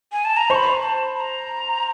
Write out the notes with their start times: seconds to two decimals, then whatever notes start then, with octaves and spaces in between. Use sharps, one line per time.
0.12 G#5
0.25 A5
0.37 A#5
0.50 C5 C#6
0.55 B5
0.82 A5
1.15 B5
1.20 A#5